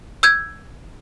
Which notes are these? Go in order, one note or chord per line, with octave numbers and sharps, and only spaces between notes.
E6 G6 G#6